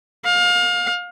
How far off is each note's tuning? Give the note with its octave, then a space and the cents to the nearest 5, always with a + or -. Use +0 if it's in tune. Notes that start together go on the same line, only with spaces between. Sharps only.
F5 +30